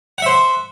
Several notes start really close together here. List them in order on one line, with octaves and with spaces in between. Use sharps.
F#5 E5 C5